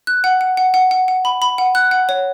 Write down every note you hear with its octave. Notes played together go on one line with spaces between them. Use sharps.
F#6
F#5
F#5
F#5
F#5
F#5
F#5
B5
B5
F#5
F#6
F#5
C#5